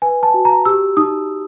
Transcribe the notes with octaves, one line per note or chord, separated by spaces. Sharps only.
B4 G#5
A5
F#4
A#5
G4 E6
D#4 D#6